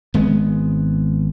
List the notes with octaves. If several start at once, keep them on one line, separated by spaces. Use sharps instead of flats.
G#1 G#3 B3